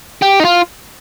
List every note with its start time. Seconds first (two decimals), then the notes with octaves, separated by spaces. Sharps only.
0.22 G4
0.40 D#4
0.45 F4